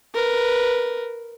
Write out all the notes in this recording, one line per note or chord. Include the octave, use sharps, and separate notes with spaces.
A#4 B4